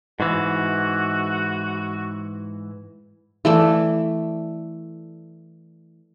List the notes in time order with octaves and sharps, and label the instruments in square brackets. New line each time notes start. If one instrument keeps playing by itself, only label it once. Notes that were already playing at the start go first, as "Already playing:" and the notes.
[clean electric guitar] G#2 E3 [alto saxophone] F#4
[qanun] E3 A3 D5